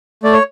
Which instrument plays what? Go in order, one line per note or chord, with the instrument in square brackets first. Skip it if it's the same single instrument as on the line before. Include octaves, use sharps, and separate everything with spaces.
[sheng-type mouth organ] A3 D5
C#5